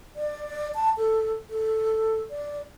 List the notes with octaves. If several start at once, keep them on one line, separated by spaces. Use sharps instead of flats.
D5
A5
A4
A4
D5